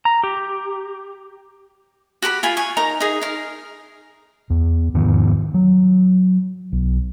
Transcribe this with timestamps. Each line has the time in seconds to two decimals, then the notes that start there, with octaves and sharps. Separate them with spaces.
0.05 A#5
0.24 G4
2.22 F#4 G4 A#5 B5
2.43 F4 G#5 B5
2.57 G#5 C#6
2.77 D#4 A#4 A#5
3.00 D#4 G#4
3.21 D#4 A#4
4.50 E2
4.94 E2 G#2 D#3 B3
5.54 F#3
6.72 B1